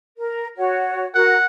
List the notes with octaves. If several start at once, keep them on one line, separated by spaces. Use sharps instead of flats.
A#4
F#4 C#5
F#4 A#4 F#5